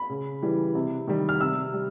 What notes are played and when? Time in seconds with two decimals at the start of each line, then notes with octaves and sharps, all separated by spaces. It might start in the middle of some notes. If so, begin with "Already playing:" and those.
Already playing: B5
0.09 C#3
0.42 E3 G3
0.75 C3
1.07 D#3 G3
1.29 F6
1.40 C3 E6
1.73 G3